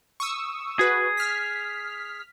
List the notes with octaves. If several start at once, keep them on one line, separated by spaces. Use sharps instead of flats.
C#6 D#6 E6
F#4 G#4 B4
F6 B6